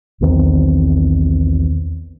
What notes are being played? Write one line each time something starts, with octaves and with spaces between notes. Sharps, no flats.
B1 E2 D#3 C4